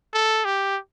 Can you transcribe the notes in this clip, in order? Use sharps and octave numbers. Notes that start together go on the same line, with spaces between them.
A4
G4